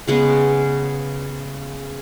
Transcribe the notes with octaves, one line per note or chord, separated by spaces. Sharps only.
C#3 G#3 B3